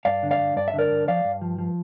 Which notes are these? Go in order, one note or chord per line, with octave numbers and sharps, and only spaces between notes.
G2 D5 F5
D3
D5 F5
G2
G2 D5
E5
D3
A#4 D5
G2
F3 D5 F5
G2
F3
F3